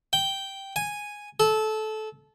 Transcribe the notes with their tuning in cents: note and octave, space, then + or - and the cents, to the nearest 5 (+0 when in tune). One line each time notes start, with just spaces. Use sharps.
G5 -5
G#5 -5
A4 -20